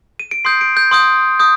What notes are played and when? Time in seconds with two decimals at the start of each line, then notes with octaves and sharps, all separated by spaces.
0.20 D#7
0.31 D7
0.44 C6 D#6 G6 C7
0.61 D7
0.77 G6
0.91 C6 D#6 G6
1.39 D#6 G6